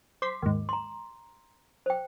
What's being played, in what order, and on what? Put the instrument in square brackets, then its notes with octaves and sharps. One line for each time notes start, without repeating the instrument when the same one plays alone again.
[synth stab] C5 C6 B6 [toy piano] D6
[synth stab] D#2 G#2
[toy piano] A#5 C6
C5 G5